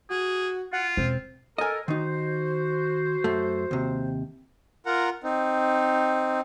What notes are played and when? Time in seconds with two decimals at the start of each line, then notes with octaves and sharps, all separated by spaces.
0.10 F#4 G#4
0.73 F4 F#5
0.97 E1 C4
1.58 A4 A#4 D#5 G#5
1.88 D#3 D#4 F#4 C5
3.24 F#2 A3
3.71 D#2 C3
4.86 F4 A#4 F#5 A#5
5.24 C4 D#4